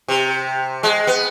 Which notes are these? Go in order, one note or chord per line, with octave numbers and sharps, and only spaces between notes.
C3
G#3
B3